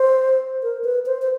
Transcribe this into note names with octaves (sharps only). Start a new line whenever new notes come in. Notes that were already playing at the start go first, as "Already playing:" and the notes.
Already playing: C5
A#4
B4
C5
C5